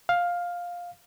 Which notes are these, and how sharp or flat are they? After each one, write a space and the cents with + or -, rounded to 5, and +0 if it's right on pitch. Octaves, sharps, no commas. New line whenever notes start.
F5 +10